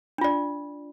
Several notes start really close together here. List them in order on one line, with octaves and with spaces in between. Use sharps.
D4 F4 D5